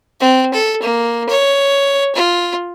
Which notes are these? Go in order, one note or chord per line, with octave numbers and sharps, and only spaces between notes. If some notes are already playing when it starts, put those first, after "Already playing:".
C4
A4
A#3
C#5
F4